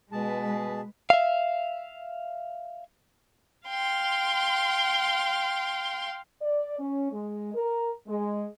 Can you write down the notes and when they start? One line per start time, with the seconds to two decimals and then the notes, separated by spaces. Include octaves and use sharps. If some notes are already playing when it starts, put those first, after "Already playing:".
0.12 B2 G#3 G#4 B4 A5
1.10 E5 F5
3.68 F5 G5 C6
6.42 D5
6.79 C#4
7.12 G#3
7.54 A#4
8.07 G#3